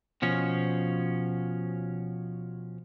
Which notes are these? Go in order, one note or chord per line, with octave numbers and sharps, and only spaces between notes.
B2 F3 C#4